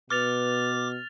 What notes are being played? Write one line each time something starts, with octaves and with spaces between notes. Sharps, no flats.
B2 B4 D6 F6 A6 F7